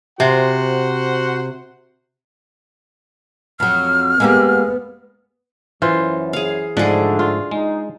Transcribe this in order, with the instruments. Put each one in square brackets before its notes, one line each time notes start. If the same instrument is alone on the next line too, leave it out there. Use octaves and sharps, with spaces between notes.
[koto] C3 [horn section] F#4 C5 F#5
[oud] F2 F#3 [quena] F6
[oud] G#3 A#3 G4 [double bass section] B3
[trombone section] F#2 [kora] E3 F4 C5
[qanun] G#4 F5
[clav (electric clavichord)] G#2 F3 [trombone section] D3 A3 [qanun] D4 G#4
[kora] F4
[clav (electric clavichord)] G#3 [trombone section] D#4